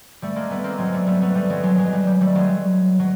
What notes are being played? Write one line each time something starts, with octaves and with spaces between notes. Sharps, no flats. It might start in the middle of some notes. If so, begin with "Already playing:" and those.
G3 A3
G#3 A#3
A3 B3
A#3 C4
F#3 G#3
A#3
G3 A3
A3 B3
A3 B3
G3 A3
F#3 G#3
F#3 G#3
F#3 G#3
G3
G3
G3 A3
F#3 G#3
F#3